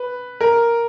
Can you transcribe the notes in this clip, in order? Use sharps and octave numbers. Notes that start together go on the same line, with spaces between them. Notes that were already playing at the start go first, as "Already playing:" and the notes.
Already playing: B4
A#4